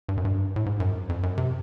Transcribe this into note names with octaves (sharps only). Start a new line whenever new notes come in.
G2
F#2
G2
A2
G#2
F#2
F2
F#2
C3